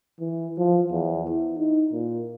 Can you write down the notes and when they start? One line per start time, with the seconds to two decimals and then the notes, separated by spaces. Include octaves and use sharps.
0.20 E3
0.58 F3
0.92 E2
1.29 E4
1.58 D#4
1.92 A#2